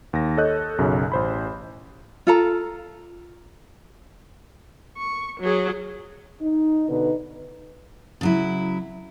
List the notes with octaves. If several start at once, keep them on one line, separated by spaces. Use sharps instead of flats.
D#2 A#6
A4 C#5 D#5 F#6 G6
B1 F#2 C#3
A1 C5 B5
F4 A4 A#5
C#6
F#3 G#4
D#4
B2 D3 D#4 B4
C#3 F#3 E4